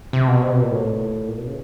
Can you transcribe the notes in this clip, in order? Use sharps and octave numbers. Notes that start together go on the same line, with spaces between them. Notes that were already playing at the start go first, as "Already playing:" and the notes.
C3
B2
C3
B2
A#2
A2
A#2
B2
C#3